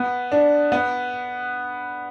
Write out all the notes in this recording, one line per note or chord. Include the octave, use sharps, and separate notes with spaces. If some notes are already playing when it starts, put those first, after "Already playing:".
Already playing: B3
D4
B3